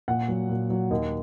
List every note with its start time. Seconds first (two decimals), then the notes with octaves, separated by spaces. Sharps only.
0.08 A#2 F#5
0.28 F#3
0.49 A#2
0.70 F#3
0.91 D#2 D#5